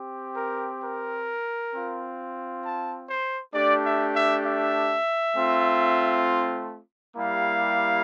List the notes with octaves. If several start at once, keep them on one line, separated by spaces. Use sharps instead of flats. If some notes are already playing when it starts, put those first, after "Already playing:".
Already playing: C4 G4
A#4
A#4
C4 F4
A5
C5
A3 D4 G4 D5
E5
E5
E5
A3 C4 F4
G3 A#3 E4 G4 F5